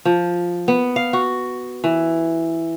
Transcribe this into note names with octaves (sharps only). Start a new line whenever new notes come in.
F3
B3
F5
F#4
E3